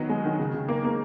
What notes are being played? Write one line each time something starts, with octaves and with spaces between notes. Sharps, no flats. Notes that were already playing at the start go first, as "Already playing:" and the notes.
Already playing: D#3 F#3 B3
G#3
D#3
C#3
C#3
A#3
A#3